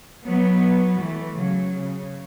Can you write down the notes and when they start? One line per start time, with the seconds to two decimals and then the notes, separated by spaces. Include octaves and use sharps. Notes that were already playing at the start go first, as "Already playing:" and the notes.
0.24 F#3 B3
0.98 E3 A3
1.35 C#3 F#3
1.73 C#3